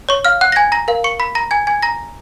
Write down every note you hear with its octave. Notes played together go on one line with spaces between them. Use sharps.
C#5 C#6
F5 F6
F#5 F#6
A#6
G#5 G#6
A#5 A#6
A#4 F5
C#6 C#7
B5 B6
A#5 A#6
G#5 G#6
G#5 G#6
A#5 A#6